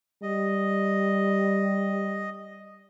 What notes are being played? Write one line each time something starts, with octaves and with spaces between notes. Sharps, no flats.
G3 D#5